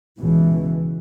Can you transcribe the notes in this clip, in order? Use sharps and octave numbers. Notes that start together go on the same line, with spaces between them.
C#2 B2 E3